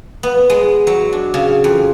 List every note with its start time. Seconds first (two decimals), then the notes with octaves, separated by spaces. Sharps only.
0.23 B3
0.50 G#3
0.87 F#3
1.13 D4
1.34 C#3
1.64 F2